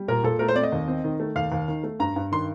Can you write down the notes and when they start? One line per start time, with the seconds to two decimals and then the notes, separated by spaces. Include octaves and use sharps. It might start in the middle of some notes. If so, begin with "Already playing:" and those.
Already playing: G3
0.08 A#2 A#4
0.23 A#2 A4
0.39 A3 A#4
0.48 C5
0.55 C4 D5
0.63 D#5
0.72 D#2
0.88 C4
1.04 D#3
1.20 A3
1.36 D#2 F5
1.52 D#2
1.68 D#3
1.83 A3
2.00 G2 A#5
2.16 G2
2.32 D#3 C6